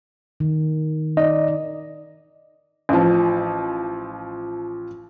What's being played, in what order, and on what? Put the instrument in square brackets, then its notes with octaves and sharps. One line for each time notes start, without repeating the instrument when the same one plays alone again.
[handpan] D#3
[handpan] D#4 D5 [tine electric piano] D#5
[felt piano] A1 F3